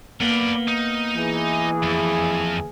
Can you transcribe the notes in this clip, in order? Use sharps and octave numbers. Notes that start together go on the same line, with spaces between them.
A#3 B3 B4 D5
D#4
E3 G#4
F2